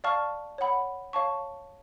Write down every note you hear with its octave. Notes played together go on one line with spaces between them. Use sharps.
D5 F5 A5 C#6 F6
C#5 F#5 B5
C#5 F5 A5 C#6